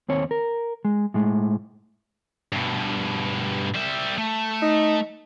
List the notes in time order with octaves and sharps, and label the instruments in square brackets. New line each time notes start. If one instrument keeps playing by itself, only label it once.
[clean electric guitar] D#2 C4 C#5
A#4
G#3
A2 G#3
[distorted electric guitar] G2 B2
G3 E5
A3
[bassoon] D#4